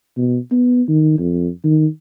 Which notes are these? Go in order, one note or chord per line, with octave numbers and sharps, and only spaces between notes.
B2
B3
D#3
F2
D#3